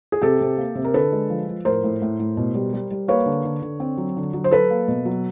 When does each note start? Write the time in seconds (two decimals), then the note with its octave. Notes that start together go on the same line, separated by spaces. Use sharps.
0.12 G#4
0.22 C3 G4 A4
0.41 C3
0.57 A#3
0.75 C3
0.85 A#4
0.94 D3 A4 B4
1.12 G#3
1.30 F3
1.48 F3
1.65 A2 A#4 C5
1.84 A2
2.02 A2
2.19 A2
2.37 B2
2.55 G3
2.73 G3
2.91 G3
3.08 A#3 B4 C#5
3.26 D3
3.45 D3
3.62 D3
3.80 C4
3.98 F#3
4.17 D3
4.34 F#3
4.44 C5
4.51 F#3 A4 B4
4.70 A#3
4.88 B2
5.06 F#3